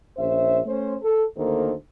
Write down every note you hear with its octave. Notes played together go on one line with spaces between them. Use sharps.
A#1 C#4 C5 E5
A3 C#4 C5
A4
D2 D#3 A#3 A4 C5